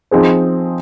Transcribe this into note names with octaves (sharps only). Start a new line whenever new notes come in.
F3 C4 D#4 G#4 C5